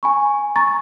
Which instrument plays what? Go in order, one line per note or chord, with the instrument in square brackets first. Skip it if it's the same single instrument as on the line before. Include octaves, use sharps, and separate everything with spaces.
[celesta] G#5 B5 C#6
A#5 C#6 A6